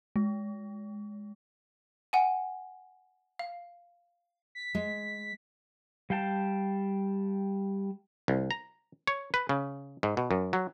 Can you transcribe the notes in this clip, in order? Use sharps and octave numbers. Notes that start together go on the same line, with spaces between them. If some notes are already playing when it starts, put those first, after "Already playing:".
G#3
F#5 G#5
F5
B6
G#3
G3 F5 G5 A5
C2
A#5
C#5
B4
C#3
G#2
B2
F#2
F#3